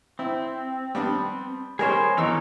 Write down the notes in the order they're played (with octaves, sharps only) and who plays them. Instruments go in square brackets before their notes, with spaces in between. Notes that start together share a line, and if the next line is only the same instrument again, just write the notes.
[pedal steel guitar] C4 [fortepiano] E4
[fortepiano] G3 B3 D4
[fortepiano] G3 A#4 C#5 [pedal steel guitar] G#4 C5
[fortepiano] G#1 E2 E6 [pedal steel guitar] D#4 A#4 C#5